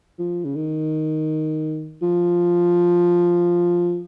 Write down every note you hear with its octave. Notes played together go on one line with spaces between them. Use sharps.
F3
C#3
D#3
F3